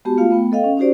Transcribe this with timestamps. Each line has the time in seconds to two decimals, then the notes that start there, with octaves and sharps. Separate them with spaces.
0.05 G#3 B3 F#4 G4 A5
0.18 A3 F4 F5
0.31 A3 B3 G5
0.52 A4 D#5 F5 G5
0.64 C#4
0.77 C#4 D#4 F#4 G4 C5 D5